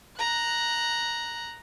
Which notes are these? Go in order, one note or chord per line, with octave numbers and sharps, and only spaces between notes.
A#5 F#6